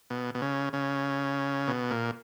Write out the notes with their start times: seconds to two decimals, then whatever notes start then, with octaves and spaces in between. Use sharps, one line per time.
0.10 B2
0.35 B2
0.42 C#3
0.73 C#3
1.67 B2
1.91 A#2